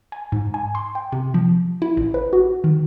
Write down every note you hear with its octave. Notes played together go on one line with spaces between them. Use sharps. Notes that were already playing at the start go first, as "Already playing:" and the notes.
G#5
G#2
G#5
C6
G5
C3
F3
E4
A1
B4
F#4
D#3